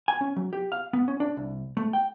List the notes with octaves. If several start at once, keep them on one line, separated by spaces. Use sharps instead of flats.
G#5
C#4
F#3
G4
F5
B3
C#4
D4
C2
A3
G5